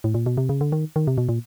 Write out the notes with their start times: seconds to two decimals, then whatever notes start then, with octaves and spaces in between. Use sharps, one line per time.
0.04 A2
0.14 A#2
0.26 B2
0.37 C3
0.49 C#3
0.61 D3
0.72 D#3
0.96 D#3
1.07 C3
1.18 B2
1.29 A#2